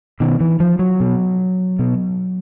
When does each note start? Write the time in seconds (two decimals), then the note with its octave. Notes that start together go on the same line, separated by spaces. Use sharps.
0.20 B2 D#3
0.40 E3
0.60 F3
0.79 F#3
1.00 B2
1.79 B2